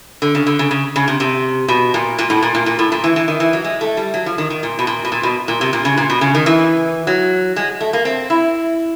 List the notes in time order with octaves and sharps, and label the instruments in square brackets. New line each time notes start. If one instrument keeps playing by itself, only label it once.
[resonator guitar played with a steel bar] D3
C#3
D3
C#3
C#3
C#3
C3
C3
B2
A#2
A#2
A2
A#2
A#2
A#2
A2
A#2
E3
E3
D#3
E3
F#3
G#3
A3
G3
F#3
F3
D#3
D#3
A#2
B2
A#2
B2
A#2
B2
A#2
C3
A#2
C#3
A#2
B2
C#3
D#3
E3
F#3
G#3
A3
A#3
C4
E4